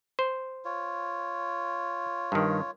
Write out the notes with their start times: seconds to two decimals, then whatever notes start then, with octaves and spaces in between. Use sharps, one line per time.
0.19 C5
0.65 F4 C#5
2.32 G2 D#3